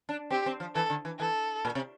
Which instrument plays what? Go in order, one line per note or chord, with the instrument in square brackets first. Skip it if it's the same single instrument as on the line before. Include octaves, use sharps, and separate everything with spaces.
[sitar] D4
[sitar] C4 [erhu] G4
[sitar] C4
F3
[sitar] E3 [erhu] A4
[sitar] D3
E3
[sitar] E3 [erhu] A4
[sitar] A#2
C3